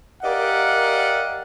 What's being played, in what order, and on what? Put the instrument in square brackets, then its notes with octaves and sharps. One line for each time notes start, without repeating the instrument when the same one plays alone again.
[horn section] G4 A#4 D5 D#5 F5 F#5